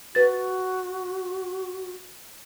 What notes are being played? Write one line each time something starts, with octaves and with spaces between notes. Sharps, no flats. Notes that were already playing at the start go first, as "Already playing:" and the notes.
F#4 B4 A6